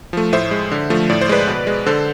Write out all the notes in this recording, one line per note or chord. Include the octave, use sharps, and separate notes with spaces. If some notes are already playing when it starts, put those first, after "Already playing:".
F3 A3
A2 C5 E5
G#3
D3
F3 A3
A2 D5
C5
G#3 B4 D5
B2
G#3
D3 A4 C5